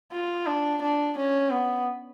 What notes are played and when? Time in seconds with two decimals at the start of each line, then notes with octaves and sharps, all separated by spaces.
0.12 F4
0.47 D4
0.82 D4
1.17 C#4
1.52 B3